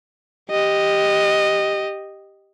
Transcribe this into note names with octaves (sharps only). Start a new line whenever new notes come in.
G4 D#5